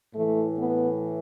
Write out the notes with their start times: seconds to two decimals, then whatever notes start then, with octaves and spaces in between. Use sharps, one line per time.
0.14 A2 E3 A3
0.57 B3